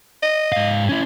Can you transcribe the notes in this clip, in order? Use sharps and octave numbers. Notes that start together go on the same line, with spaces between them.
D#5
G#2 F5
C#4 E4